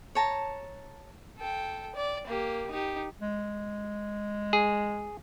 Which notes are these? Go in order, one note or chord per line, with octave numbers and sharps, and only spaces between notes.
C#5 A5 A#5
A4 G5
D5
A#3 G4
D#4 G4
G#3
G#4